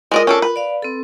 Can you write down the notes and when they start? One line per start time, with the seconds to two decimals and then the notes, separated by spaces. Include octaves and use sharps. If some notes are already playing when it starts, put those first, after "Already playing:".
0.12 G#3 F4 A#4 D5 D#5
0.27 C#4 D4 A4
0.42 B4
0.56 D5 F5
0.82 C4 A4